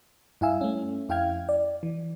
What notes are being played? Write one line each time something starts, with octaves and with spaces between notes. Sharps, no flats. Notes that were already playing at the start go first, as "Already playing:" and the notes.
G2 E4 F5 G#5 E6
A3 C#4
F2 E4 F5 G5 F6 G#6
D5
E3